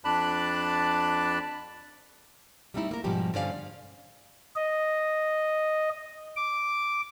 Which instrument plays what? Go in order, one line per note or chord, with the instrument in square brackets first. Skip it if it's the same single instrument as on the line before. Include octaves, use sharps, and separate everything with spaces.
[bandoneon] F2 D4 D5 A5 B5 F#6
[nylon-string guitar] G3 A3 C4 D#4 E4
A#3 A#4
G#2 B2 F3 G3 G4
G2 D3 C#4 C5 D5 F5
[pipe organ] D#5
D6